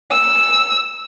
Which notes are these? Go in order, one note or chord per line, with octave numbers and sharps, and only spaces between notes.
E6